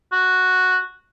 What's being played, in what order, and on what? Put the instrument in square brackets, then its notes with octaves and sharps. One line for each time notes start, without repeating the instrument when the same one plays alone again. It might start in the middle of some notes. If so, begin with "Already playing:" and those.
[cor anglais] F#4